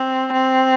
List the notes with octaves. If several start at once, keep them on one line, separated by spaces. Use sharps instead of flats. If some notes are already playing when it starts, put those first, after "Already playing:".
Already playing: C4
C4